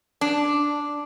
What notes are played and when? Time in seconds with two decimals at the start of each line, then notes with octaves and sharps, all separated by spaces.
0.21 D4